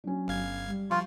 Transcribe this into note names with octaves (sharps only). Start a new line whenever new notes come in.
F#3 C#4 D4
G1 F5 G#6
G3
F3 F4 C#6 F6 G6